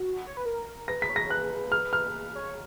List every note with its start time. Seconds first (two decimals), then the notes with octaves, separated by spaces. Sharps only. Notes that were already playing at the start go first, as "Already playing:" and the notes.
Already playing: F#4
0.27 C#5
0.37 B4
0.46 A#4
0.88 B4 A#6
1.02 B6
1.10 C#5
1.16 A#6
1.30 B4 F#6
1.72 F6
1.93 F6
2.35 C#5